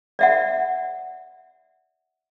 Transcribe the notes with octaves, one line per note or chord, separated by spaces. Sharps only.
D5 E5 F#5